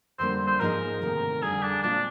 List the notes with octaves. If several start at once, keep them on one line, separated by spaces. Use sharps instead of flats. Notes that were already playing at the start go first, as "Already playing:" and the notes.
F2 D3 G3 A#3 D4 C5
C5
G#2 F3 A#3 D#4 G#4 A#4
D2 C3 D#3
F2 D3 G3 G#4
D4
A#2 G#3 C4 D4 F4